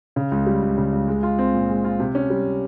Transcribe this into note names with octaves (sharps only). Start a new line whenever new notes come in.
C#3
C#2
G3
C#2
C#3
C#2
G#3
F4
C4
A#2
G#3
F4
C3
C#4
G3